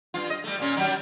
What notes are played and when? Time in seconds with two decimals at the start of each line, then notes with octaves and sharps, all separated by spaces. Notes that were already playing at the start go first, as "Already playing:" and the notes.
0.14 G2 F4
0.30 D#5
0.44 G3 A3
0.59 A#2 C#4
0.76 D#3 F#3 G3